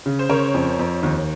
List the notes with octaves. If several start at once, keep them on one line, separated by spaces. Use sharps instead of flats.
C#3
C5
C#3 A#4 C#5
F2
F2
D#2